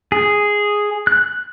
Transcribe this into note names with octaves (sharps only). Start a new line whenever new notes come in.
G#4
F#6